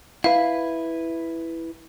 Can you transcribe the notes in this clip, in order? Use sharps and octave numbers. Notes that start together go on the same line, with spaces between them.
E4 B4 F5